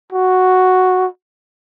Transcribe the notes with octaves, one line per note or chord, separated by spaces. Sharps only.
F#4